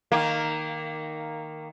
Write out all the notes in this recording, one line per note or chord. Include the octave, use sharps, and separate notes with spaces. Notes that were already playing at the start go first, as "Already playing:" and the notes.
D#3 A#3